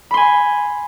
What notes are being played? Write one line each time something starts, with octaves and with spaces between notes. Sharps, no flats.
G#5 B5 C6